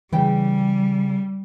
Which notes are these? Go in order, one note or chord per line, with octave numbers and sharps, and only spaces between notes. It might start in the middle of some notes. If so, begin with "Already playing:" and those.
C#3 E3 G3 G5